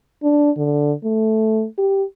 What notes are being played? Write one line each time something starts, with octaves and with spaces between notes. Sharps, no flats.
D4
D3
A3
G4